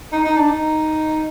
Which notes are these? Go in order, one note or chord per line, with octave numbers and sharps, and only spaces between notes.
D#4
D#4
D4
D#4